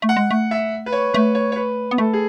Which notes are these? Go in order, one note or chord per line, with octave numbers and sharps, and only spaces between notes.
A3
F#5
G#3
A3
E5
B4
C#5
A3 B4
C#5
C#5
B4
B3
A3 A4
G#4